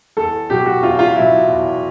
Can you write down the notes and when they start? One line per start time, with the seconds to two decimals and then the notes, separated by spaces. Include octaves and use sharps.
0.17 E2 A4
0.50 B2 F#3 G4
0.66 F#4
0.82 E2 F4
0.99 F4
1.15 B2 F#3 E4
1.32 E4
1.48 E2